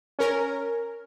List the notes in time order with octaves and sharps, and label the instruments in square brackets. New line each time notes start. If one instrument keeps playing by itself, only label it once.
[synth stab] C#4 A#4